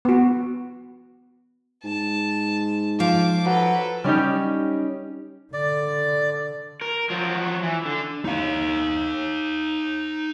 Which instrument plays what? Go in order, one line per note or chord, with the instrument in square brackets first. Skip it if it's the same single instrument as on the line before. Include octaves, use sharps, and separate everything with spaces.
[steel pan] B3 F#4
[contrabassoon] G#2 [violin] A5
[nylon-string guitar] F3 [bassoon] F4 [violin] D6
[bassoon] F#3 [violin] A4 B4
[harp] G3 C#4 D#4 G4
[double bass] D3 [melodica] D5
[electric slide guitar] A#4
F3 F#3
E3
D3
[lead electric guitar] D#4 F5